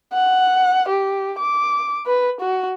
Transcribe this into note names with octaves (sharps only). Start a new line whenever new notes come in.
F#5
G4
D6
B4
F#4